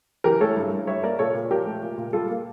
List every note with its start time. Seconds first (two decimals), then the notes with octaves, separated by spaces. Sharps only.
0.24 E3 G4 A#4
0.40 A3 A4 C#5
0.57 G2
0.72 G2
0.87 G3 C#5 E5
1.03 A#3 A#4 D5
1.19 A#2 A4 C#5
1.34 A#2
1.50 F3 G4 A#4
1.66 A3
1.83 A#2
1.98 A#2
2.13 G3 F4 A4
2.30 A#3